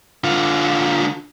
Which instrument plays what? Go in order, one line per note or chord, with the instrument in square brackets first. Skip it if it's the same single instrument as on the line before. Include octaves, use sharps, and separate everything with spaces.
[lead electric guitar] D3 F4